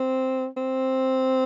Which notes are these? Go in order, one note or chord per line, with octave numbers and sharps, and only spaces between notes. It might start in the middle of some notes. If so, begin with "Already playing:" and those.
Already playing: C4
C4